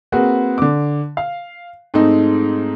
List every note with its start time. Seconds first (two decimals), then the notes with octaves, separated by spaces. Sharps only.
0.12 A#3 C4 F#4 G#4 B4
0.58 D3 D6
1.17 F5
1.94 G#2 G#3 A3 C4 D#4